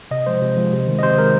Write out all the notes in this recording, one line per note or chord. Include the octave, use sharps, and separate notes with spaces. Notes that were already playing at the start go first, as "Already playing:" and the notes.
C3 D#5
F3 G#3 C5
C3
F3 G#3
C3
D#3 G#3
D#5
C3 C5
D#3 G#3 A#4